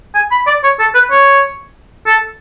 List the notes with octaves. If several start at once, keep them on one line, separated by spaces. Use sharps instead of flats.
G#5
B5
D5
C#5
A4
B4
C#5
A4